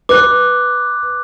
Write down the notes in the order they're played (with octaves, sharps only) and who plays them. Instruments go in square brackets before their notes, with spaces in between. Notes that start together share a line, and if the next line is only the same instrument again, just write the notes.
[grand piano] B4 [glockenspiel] D6 F#6